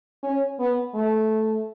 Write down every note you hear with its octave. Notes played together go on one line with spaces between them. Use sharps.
C#4
B3
A3